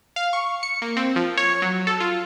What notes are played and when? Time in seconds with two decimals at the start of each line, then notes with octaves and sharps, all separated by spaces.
0.16 F5
0.33 C#6
0.63 C#7
0.82 A#3
0.97 C4
1.16 F3
1.37 C#5
1.62 F#3
1.87 A4
2.00 F4